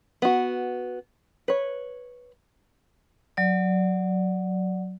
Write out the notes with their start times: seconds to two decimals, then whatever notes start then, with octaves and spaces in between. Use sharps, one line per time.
0.22 B3 F#4
1.48 B4 C#5
3.37 F#3 D5